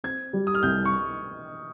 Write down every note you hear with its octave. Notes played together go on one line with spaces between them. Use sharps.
C4 G#6
G3
D#6
F6
C2 G6
C#6